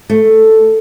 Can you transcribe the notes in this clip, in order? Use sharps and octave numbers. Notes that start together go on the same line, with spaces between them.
A3